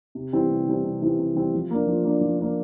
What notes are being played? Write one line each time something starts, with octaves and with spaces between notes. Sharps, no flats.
C3
E3 G3 C4
C3
E3 G3 C4
C3
E3 G3 C4
C3
E3 G3 C4
F3
A#3 D4
F3
A#3 D4
F3
A#3 D4